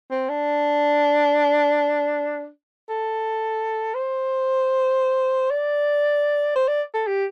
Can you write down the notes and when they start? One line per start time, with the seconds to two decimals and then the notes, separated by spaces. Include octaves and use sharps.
0.11 C4
0.29 D4
2.89 A4
3.94 C5
5.50 D5
6.55 C5
6.68 D5
6.94 A4
7.07 G4